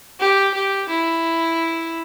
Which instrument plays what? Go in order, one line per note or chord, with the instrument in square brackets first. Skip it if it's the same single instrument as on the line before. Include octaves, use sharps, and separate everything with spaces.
[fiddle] G4
G4
E4